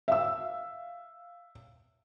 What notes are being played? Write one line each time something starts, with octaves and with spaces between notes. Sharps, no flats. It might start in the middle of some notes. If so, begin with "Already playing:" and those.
E5 F5 E6